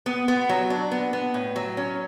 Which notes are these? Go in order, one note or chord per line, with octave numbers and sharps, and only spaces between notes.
B3
B3
F#3
D4
B3
B3
A2
F#3
C#4